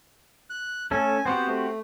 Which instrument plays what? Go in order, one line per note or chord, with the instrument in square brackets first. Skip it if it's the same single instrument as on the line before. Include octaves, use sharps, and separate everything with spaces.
[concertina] F#6
[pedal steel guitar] A3 C#4 A4 [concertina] G#5
[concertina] B3 C5 [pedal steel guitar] C4 F#4 G4
[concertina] A3